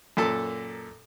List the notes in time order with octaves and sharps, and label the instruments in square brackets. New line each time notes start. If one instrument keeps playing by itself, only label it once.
[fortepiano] F#2 A#2 A4 A5